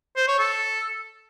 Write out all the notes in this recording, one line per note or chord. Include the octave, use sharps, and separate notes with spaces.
C5
C#5
A4